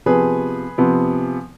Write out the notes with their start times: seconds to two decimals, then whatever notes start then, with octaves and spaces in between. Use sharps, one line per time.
0.06 C3 F3 B3 G#4 B4
0.78 C3 F3 B3